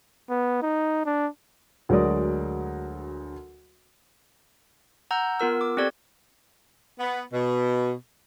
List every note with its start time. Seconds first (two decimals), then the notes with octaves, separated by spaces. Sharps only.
0.29 B3
0.62 D#4
1.06 D4
1.89 D2 F#3 G#3 A#4 D5 D#6
5.11 F#5 A#5 E6 G6
5.40 B3 F4 A#4 E6
5.61 D6
5.77 C4 G4 A4 D5 G#6
6.99 B3
7.33 B2